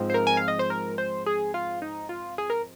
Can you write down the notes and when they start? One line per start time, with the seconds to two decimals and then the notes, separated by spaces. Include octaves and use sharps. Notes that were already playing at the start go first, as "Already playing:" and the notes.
Already playing: G#2 F3 G#3 C4
0.10 C5
0.14 A#4
0.27 G#5
0.37 F5
0.48 D#5
0.59 C5
0.70 A#4
0.98 C5
1.26 G#4
1.54 F4
1.82 D#4
2.09 F4
2.38 G#4
2.50 A#4